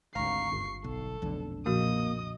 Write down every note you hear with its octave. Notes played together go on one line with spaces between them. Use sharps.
G#1 D2 F5 A#5 C#6 C7
G1
B1 A4
F1 B1 D3
A#2 F3 A#3 F#4 D#5 D#6